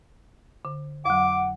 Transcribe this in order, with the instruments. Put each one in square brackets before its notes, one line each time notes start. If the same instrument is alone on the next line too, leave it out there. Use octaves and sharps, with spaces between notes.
[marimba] D3
[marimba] F2 F#3 [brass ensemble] F#5 [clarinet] D6